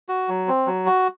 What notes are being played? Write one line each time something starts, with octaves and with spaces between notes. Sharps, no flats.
F#4
F#3
C4
F#3
F#4